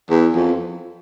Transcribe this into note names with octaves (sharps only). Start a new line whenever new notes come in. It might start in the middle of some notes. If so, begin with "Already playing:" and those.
E2
F2